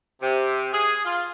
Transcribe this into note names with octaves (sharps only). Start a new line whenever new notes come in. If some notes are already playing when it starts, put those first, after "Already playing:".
C3
G#4
F4